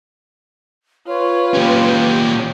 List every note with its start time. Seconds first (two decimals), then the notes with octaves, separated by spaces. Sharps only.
1.08 F4 B4 C#5
1.54 A#2 C#4 G4